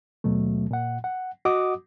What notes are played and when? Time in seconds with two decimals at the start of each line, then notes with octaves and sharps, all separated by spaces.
0.24 D#2 B2 F#3 A3
0.71 A#2 F#5
1.04 F#5
1.45 F#4 D#5 F#5 D6 D#6